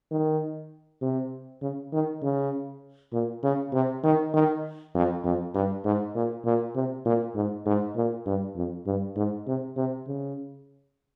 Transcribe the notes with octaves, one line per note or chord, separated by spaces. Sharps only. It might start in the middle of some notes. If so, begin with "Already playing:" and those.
D#3
C3
C#3
D#3
C#3
A#2
C#3
C3
D#3
D#3
F2
F2
G2
G#2
A#2
A#2
C3
A#2
G#2
G#2
A#2
G2
F2
G2
G#2
C3
C3
C#3